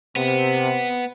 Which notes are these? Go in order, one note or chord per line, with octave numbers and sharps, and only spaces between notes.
C3 B3